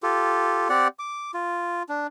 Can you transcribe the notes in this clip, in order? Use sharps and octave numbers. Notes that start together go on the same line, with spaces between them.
F4 G4 A4
C4 G4 D5 F#5
D6
F4
D4